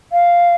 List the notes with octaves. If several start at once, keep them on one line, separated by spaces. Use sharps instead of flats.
F5